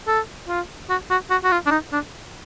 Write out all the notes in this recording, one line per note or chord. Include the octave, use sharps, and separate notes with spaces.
A4
F4
F#4
F#4
F#4
F#4
F4
D4
D#4
D4